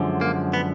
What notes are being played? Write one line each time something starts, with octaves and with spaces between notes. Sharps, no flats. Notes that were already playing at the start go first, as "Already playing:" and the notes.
Already playing: F#2 D3 F3 G#3
A#3
B3